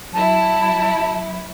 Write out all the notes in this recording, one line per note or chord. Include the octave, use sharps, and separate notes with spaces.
F#3 E4 A5